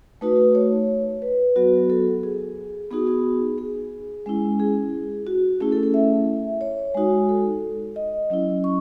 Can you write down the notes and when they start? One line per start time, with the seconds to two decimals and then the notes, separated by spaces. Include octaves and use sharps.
0.21 A3 D#4 F#4 B4
0.55 C#5
1.22 B4
1.56 F#3 B3 F#4
1.90 A4
2.23 G#4
2.91 B3 D#4 F#4 G#4
3.07 G#4
3.58 G#4
4.26 G#3 C#4 E4
4.60 G#4
5.27 F#4
5.60 A3 C#4 E4 G#4
5.72 A4
5.83 A4
5.94 E5
6.61 C#5
6.94 G#3 D#4 F#4
7.29 A4
7.96 D#5
8.30 F#3 C#4 E4
8.64 C#6